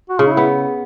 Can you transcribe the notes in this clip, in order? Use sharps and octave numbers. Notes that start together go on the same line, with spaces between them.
F#4
C#3 F4
D#4
B3 E4